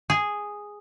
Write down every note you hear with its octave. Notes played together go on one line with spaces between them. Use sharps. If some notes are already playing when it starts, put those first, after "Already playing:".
G#4